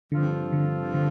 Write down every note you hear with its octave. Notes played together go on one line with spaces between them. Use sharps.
G2 D3 F3 C4 F4 A4
D3
D3